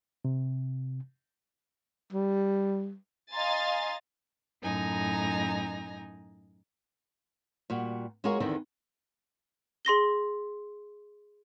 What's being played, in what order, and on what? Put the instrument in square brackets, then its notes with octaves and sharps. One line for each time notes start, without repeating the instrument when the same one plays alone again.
[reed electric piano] C3
[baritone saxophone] G3
[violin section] D#5 F5 G#5 A#5 C6 A6
[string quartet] F#2 A2 D#4 G#5 A#5
[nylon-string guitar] A#2 G3 F#4
G#3 F4 F#4 G#4 A#4 C#5
E2 D3 D#3 C4 E4
[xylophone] G#4 C6 A#6 G7